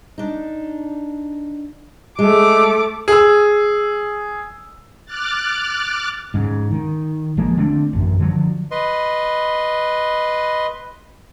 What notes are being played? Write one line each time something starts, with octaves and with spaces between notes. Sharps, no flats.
D4 D#4
G#3 A3 D6
G#4 E6
D6 F6 F#6 A6
G#2 C#3
D#3
A1 F3 G#3 A#3
D3 A3 C4 D4
A1 F#2
D3 F3 F#3
B4 D#5 C6